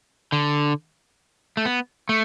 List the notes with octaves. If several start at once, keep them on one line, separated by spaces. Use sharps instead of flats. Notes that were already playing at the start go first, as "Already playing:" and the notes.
D3
A3
B3
A3